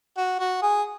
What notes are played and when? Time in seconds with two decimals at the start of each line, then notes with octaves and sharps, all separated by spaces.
0.17 F#4
0.39 F#4
0.62 G#4